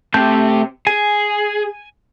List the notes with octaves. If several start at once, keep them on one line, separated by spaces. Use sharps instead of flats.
C3 A3 G4 A5 G6
G#4 G#5